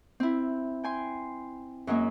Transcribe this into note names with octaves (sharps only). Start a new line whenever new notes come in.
C4 E4
G5 G#5 C6
F#2 F#3 G#3 A#3 C#4